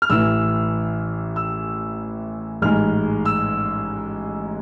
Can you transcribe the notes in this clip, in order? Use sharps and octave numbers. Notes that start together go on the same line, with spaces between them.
F6
A1 A2 E3 E6
E6
A1 G#2 G#3 F6
E6